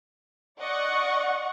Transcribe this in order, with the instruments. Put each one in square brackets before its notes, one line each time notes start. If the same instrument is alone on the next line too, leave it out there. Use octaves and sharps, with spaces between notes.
[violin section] D5 D#5 F#5 C#6